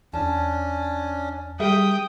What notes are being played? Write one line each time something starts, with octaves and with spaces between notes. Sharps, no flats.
E2 C#4 D4 A5
G3 G#4 A#4 E5 G5 D#6